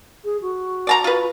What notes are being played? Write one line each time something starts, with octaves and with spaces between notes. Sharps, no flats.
G#4
F#4
D5 A5 A#5
F4 B4